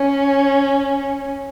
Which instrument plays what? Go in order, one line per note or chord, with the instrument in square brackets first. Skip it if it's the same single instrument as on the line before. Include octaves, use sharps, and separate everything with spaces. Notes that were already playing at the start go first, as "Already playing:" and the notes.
Already playing: [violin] C#4